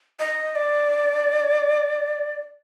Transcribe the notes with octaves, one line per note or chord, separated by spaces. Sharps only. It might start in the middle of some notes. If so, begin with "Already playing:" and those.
D#5
D5